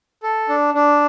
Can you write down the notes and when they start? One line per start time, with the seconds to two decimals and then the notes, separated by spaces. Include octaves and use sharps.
0.23 A4
0.49 D4
0.74 D4